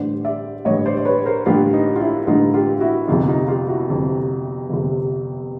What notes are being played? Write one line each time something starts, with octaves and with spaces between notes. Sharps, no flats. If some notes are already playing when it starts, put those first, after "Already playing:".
Already playing: A1 G2 D3 C5 D5
D5 E5
A1 G2 D3 C#5 D#5
C5 D5
D5
B4 C#5
A#4 C5
A1 G2 D3 F4 G4
D#4
F4
D4 E4
A1 G2 D3 D#4 F4
F4 G4
E4 F#4
G1 F2 C3 D#4 F4
D#4 F4
F4 G4
E4 F#4
G1 F2 C3
G1 F2 C3